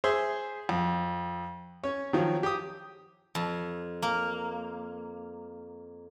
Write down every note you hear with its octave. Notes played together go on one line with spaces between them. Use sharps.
G#4 C5 E5 C6
F2
C#4 C#5
D#3 F3 F#3
G4 D#6
F2
A#3